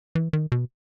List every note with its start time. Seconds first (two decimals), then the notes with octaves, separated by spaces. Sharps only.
0.15 E3
0.33 D#3
0.52 B2